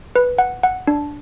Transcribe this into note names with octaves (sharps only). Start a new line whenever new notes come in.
B4
F#5
F#5
D4